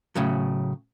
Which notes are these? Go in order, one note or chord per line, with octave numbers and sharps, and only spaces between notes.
A2 C#3 F#3